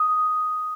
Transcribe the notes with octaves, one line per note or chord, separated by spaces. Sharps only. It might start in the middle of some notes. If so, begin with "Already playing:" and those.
Already playing: D#6